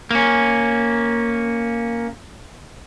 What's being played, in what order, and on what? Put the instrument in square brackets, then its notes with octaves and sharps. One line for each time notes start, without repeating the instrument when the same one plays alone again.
[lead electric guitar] A#3 C#4